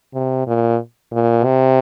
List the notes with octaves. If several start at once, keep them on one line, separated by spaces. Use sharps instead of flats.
C3
A#2
A#2
C3